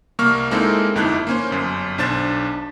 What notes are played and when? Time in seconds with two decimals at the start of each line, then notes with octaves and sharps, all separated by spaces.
0.19 C2 A#3 C#6 F6
0.51 G#3 A#3 C4 D#4 E4 A4
0.95 G1 F2 D#4 E4 F#6 G6
1.27 A#3 C#4 C5
1.51 G1 F#2
1.98 B1 D4 C5 A6 E7